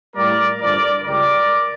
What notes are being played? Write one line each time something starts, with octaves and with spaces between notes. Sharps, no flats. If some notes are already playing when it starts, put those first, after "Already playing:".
A2 G3 A#3 A#4 D5
G2 D3 F3 A#4 D5
C#2 C#3 G3 A#4 D5